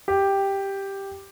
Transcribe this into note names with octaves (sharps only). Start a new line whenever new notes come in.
G4